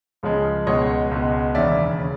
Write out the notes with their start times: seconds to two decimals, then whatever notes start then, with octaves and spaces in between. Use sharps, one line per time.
0.23 C#2 C#3 F3 G#3
0.66 C#2 B2 G#3 C#5 D#5
1.11 C#2 B2 G#3
1.55 E1 D#2 C#3 D5 E5
1.99 C#3